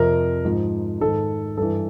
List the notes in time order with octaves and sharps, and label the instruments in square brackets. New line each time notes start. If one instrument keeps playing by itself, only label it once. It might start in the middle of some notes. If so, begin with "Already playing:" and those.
Already playing: [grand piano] F2 C3 F3 A#4
G#2 F3
G#2 D#3 A4
G2 E3 A4